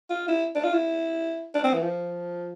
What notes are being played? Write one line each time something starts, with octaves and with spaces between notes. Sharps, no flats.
F4
E4
D4
F4
E4
D4
C4
E3
F3